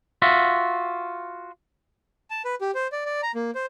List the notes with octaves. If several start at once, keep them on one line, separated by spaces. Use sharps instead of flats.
F4 F#4 E5
A5
B4
G4
C5
D5
D5
A#5
A#3
C5